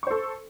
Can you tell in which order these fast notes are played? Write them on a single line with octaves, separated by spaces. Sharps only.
C#6 C5 A4